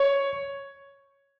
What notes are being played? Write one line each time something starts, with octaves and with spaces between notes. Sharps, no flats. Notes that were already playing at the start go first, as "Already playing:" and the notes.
Already playing: C#5